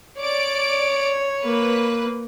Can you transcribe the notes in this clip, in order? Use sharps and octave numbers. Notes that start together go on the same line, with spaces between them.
C#5 D5 D7
A#3 B4